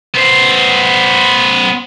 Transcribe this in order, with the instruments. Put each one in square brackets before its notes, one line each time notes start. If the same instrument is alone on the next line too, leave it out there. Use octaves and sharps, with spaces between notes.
[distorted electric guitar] B3 C5